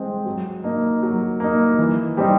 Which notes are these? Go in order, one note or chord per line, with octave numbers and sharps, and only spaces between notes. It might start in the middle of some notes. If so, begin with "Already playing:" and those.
Already playing: E3 G#3 C4
F#3
A#3 D#4
F#3
A#3 D#4
E3
G3 C4 D#4